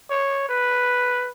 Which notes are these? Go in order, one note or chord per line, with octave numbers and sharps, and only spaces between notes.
C#5
B4